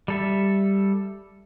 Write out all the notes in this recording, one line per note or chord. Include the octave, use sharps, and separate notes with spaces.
G3 A4 E5